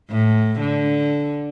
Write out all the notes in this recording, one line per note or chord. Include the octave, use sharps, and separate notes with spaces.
A2
D3